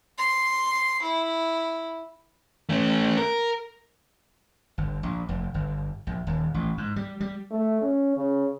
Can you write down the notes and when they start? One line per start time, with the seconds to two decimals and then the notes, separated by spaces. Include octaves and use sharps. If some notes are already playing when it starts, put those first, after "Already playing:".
0.18 C6
1.02 E4
2.69 A3 C#4
3.17 A#4
4.78 G1
5.03 A#1
5.29 F1
5.54 G1
6.07 A#1
6.27 D#1
6.54 A1
6.78 G#2
6.96 G3
7.20 G3
7.51 A3
7.82 C#4
8.16 C#3